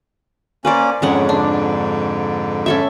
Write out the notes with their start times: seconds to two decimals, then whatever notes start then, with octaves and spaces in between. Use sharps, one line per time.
0.65 A#3 C#4 B4 C5 D5
1.02 F2 G#2 D3 G#3 C#4 F#5
1.29 D4
2.66 C#4 A4 E5